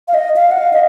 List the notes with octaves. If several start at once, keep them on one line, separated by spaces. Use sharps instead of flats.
F5
D#5
F5
F#5
F5
D#5